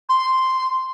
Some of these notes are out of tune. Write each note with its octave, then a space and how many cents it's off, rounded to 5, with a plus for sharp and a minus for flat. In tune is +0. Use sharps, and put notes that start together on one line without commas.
C6 -5